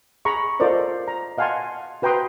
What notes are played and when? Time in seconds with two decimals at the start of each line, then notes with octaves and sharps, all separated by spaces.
0.25 G#4 A#5 B5 C#6
0.60 F4 A4 A#4 C5 D5 D#5
1.08 A#5
1.38 D#5 F5 F#5 G#5 A5 C6
2.02 F#4 B4 G5 A#5 C6 D#6